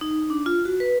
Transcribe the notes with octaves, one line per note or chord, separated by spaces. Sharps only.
D#4
D4
F4
F#4
B4